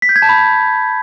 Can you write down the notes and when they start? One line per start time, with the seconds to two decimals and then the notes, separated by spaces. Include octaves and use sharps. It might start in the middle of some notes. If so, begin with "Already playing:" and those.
0.02 B6
0.09 G6
0.16 G#6
0.22 A5
0.29 B5